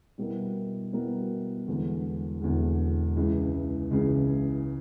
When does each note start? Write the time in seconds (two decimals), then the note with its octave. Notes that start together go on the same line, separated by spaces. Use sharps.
0.18 B2 G3 B3 E4 A#4
0.93 B2 G3 B3 E4 A#4
1.67 E1 E2 D3
2.41 E1 E2 D3
3.17 C#2 C#3 E3
3.91 C#2 C#3 E3